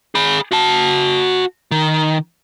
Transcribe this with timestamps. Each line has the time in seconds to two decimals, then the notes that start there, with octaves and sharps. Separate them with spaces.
0.15 G#4 B5
0.52 F#4 A5
1.71 D#3